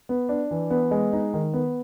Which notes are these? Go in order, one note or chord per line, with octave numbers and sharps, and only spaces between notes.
B3
D4
E3
B3
G#3
D#4
D#3
B3